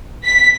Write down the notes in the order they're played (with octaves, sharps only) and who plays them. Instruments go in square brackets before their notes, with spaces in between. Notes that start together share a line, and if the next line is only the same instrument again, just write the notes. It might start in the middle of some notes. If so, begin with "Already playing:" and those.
[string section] B6